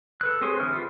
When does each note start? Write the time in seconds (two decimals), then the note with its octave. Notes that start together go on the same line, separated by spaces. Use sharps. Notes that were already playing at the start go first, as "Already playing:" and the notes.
0.21 A4 B4 F#6
0.41 C4 G4 G#4 C5 C#5
0.60 D3 E3 F6
0.73 B3 F4